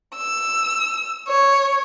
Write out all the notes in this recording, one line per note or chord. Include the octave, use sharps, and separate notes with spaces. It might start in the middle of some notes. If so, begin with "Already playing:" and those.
E6
C#5